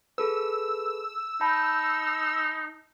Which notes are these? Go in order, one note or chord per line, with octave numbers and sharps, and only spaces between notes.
G#4 A4 B4 E6
D#4 A5 B5 G6